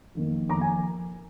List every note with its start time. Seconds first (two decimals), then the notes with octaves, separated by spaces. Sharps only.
0.15 F2 D#3 A#3
0.49 F2 D#3 A#3 A#5 D6
0.61 G#5